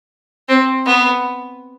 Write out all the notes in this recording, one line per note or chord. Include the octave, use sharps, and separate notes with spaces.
C4
B3